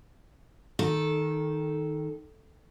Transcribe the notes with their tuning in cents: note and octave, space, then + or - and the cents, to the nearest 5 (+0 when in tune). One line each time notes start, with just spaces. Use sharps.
D#3 +0 A4 -10